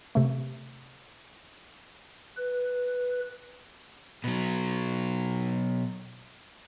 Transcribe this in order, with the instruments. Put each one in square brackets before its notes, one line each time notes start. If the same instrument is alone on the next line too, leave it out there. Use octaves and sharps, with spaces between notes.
[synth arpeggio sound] C3 A3
[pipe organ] B4
[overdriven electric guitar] B2 F#3